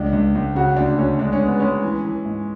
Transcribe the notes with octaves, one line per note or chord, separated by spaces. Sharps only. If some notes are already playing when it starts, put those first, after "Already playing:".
Already playing: C#2 D4
C#2
C#2
C#3 F#4
D2 D4
D2 C#4
G#3 D4
C#4
G#3
B3
G#3 C#4
E3
E3
G#2